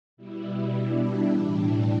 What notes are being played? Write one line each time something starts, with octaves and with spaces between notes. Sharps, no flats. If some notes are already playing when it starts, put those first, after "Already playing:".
B2 G3 E4
D4
A2 E3 G3